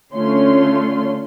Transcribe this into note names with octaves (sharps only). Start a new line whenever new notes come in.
D3 A3 C#4 F4 C#5 C6